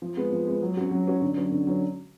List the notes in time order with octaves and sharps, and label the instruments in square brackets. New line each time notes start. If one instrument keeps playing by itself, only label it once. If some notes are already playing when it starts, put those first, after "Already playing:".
[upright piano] F3
G#3 B3
F3
G#3 B3
F#3
C#4 F#4
F#3
C#4 F#4
D3
F#3 C#4
D3
F#3 C#4